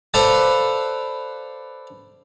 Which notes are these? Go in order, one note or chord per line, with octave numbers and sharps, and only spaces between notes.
A4 B4 C5 D5 F5 A5